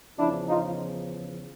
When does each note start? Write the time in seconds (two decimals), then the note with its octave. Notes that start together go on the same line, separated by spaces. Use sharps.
0.17 E2 C#3 F3 D4 E4
0.49 D#4 F4